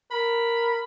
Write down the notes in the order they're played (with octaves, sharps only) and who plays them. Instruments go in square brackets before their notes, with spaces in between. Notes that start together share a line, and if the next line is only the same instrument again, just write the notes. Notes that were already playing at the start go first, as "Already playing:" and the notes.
[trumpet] A#4 [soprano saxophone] B5